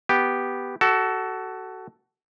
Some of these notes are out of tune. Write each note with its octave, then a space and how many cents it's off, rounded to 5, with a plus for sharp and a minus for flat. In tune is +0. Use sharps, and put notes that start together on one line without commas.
B3 +0 G4 +0
F#4 +25 A4 +0